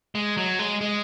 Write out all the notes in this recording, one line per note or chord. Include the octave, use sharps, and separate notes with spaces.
G#3
F#3
G#3
G#3